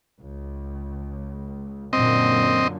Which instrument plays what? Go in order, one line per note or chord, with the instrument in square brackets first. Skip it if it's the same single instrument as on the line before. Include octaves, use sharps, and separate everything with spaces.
[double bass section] C#2
[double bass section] F#2 A#2 D3 [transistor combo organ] C4 D#5